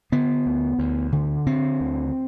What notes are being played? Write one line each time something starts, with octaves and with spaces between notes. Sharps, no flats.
D3 B3
D2
D2
D3
D3 C4
D2